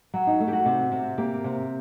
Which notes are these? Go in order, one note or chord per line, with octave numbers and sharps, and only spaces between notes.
F#3 F#4
D#4
A3
G4
F#4
C3
C3
A#3 G4
C3